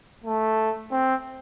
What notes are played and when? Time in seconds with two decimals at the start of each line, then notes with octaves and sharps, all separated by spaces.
0.24 A3
0.91 C4